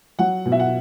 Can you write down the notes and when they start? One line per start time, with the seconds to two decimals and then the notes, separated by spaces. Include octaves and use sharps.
0.19 F#3 F#5
0.46 B2
0.52 E5
0.59 F#5